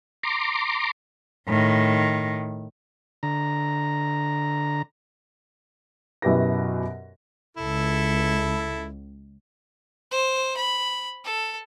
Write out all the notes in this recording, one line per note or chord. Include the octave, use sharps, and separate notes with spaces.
A#5 C6 D6
A2 D#3
D3 A#5
F#2 B2 E4 G4 B4 A#6
C#2 E4 A4
C5
B5
A4